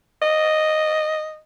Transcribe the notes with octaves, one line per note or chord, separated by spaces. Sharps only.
D#5